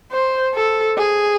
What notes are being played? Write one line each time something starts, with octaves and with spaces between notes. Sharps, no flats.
C5
A4
G#4